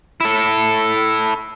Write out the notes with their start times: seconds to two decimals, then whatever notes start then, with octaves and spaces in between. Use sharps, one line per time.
0.21 E4 A4